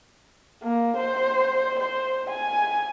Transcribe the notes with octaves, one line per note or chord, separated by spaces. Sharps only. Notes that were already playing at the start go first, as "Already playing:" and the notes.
A#3
C5
C5
G#5